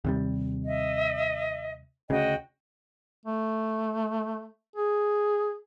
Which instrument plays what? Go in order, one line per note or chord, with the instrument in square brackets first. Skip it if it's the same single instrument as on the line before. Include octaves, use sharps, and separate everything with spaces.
[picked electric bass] D#2 C3 G3
[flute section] D#5 E5
[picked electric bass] D2 C#3 [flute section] F#4 D#5 G5
[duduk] A3
G#4